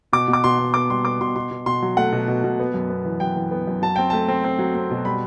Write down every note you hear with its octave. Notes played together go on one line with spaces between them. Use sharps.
B2 D6
B2
D6
B2 C6
B2
B3 D6
G3 C6
B3 D6
B2 C6
B2 C6
B2
B2 C6
F#3
A3 F#5
B2
B2
B2
B3
F#2
B3
E3
F#2 G5
E3
B3
F#2
F#3 A5
C4 G5
A3 A5
C4
C4
F#3
C4
B2
G3 B5